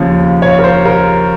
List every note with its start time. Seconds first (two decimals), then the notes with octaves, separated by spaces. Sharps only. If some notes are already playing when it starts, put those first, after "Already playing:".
Already playing: D#2 C#3 F3 C#5
0.42 C#5
0.59 A#4
0.64 C5
0.85 A#4